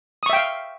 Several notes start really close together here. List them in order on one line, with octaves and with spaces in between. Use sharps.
D#6 C#6 E5 G5 F5